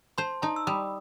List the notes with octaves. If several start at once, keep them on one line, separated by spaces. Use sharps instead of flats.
C5 A5 C6
D#4 A5 C6
E6
G3 B5 D#6